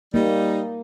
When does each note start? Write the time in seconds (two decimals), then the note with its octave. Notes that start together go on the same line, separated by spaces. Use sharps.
0.14 G3 A#3 D#4